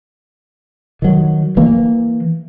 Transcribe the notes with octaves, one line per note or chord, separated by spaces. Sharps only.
D#3 F#3
E3 A#3